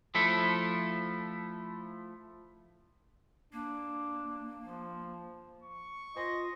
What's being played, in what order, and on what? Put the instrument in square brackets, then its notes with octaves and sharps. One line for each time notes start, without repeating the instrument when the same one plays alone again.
[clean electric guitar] F3 A3 E4 A4
[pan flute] A#3 [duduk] D4
[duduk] F3
[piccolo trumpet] C#6
[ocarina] F4 [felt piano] C5 G#5 C6 [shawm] D#5